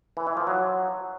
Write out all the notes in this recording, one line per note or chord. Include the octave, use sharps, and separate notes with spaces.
E3
E3
F3
F#3